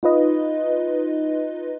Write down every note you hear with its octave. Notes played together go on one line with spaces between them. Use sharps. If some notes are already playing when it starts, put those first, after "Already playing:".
D#4 F4 B4 D#5